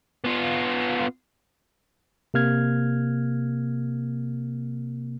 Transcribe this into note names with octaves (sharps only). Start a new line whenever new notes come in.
B3 F4
C3 A#3 F6 G#6